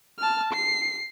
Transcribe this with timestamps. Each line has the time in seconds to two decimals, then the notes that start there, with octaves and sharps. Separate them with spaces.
0.19 A5 F6
0.53 C7